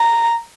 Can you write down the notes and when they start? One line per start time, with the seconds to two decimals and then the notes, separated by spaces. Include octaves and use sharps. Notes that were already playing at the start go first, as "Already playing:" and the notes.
Already playing: A#5